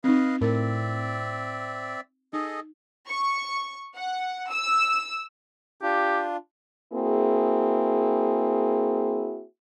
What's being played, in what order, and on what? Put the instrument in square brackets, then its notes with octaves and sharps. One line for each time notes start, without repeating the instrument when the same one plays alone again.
[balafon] C4 D#4 [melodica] B4 D#5 F5
[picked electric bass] A2 [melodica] C4 D5 E5 [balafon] A#4
[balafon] D#4 [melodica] G#4 A4 D#5
[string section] C#6
F#5
E6
[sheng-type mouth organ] D4 F4 [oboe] G4
[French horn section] A#3 C4 E4 F#4 G#4